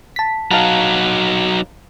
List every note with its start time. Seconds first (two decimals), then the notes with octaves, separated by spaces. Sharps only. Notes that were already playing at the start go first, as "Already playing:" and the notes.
0.16 A5 B6
0.51 F#3 D#4 F5 A5 A#5